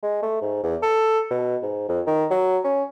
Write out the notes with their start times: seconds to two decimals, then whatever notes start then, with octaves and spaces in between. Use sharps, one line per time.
0.03 G#3
0.23 A3
0.42 G#2
0.64 E2
0.83 A4
1.31 B2
1.62 G#2
1.89 F2
2.07 D#3
2.31 F#3
2.64 C#4